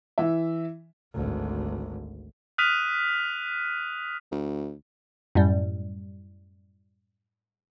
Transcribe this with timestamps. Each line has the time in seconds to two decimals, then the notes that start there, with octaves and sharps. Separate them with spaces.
0.18 E3 E5
1.14 G#1 D2
2.58 D#6 F6 F#6 B6 D#7 F7
4.31 D2
5.35 F#2 A2 G3